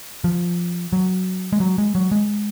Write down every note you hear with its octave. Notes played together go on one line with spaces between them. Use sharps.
F3
F#3
G#3
F#3
G#3
F#3
G#3